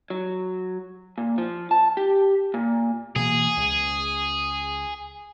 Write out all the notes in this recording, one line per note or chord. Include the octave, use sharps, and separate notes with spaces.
F#3
A#2
F3
A5
G4
A#2
B2 E3 A#3 G#4
C#2